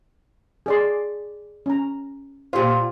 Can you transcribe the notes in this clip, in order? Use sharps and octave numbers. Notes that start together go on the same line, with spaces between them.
G#4 D5 C6
C#4 A#5
A#2 F4 G4 C5